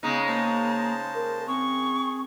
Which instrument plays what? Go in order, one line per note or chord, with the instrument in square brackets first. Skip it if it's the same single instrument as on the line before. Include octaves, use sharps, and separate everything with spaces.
[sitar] C#3 G#3 D#4 [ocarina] B3 [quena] A#5
[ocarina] A#3 [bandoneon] C5 A5
[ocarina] A#4
[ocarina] C4 [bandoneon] G#4 [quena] C#6